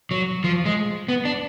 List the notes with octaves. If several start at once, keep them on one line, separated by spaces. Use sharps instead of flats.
F#3
F3
G#3
B3
D4